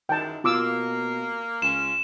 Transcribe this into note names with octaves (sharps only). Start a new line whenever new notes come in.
F#2 D#3 E3 G#3 G5 A5
B2 A#3 F4 D6 E6
C#2 C#4 F4 E7